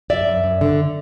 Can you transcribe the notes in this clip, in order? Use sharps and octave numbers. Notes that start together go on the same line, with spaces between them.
F#2 D5 E5
F#2
F#2
D3